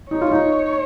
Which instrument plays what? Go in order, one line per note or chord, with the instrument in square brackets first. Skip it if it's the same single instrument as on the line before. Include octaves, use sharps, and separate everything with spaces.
[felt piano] D#4 [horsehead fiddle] C#5
[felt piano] F4
D#4